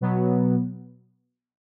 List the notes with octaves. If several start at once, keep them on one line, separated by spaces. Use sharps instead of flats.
B2 F#3 B3